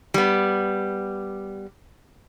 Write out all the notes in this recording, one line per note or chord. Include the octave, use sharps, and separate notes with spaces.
G3 B3